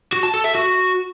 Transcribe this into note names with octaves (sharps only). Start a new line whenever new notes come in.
F#4
A5
A4
E5
F#4